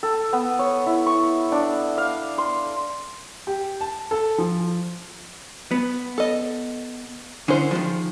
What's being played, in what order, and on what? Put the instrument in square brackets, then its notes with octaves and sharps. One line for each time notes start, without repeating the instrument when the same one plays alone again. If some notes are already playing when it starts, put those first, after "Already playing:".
[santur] A4
B3
C#5
E4
C#6
D4
F5
C6
[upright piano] G4
A5
A4
F3
[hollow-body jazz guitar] B3
[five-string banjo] A4 D#5
[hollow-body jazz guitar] D3 [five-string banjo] C#4 E4 C5
[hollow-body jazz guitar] D#3 F3 [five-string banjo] G#3